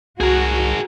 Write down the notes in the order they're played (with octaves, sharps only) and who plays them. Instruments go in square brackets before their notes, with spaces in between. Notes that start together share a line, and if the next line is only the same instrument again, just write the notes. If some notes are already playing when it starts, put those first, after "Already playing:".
[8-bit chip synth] C2 [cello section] F#4 [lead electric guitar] G#4 A#4